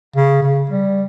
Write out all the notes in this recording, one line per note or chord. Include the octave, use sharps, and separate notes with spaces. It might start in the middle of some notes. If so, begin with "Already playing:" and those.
C#3
C#3
G3